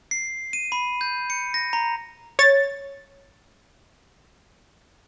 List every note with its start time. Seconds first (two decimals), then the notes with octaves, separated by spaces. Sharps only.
0.11 C7
0.53 D#7
0.72 B5
1.01 G6
1.30 C#7
1.54 A#6
1.73 A#5
2.39 C#5 A6